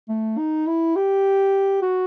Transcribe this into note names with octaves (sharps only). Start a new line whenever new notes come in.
A3
D#4
E4
G4
F#4